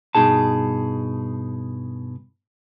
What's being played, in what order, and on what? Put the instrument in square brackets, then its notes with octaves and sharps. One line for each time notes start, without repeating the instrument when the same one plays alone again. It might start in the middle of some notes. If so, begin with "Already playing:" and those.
[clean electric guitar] G2 B2 D#4 G#4 A5